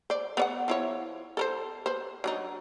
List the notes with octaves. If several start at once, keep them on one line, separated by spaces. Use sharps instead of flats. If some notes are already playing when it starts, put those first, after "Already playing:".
C5 D5
B3 C#5 F#5
F3 E4 C#5
A4 A#4 C5
B4 C5
F#3 D4 D#4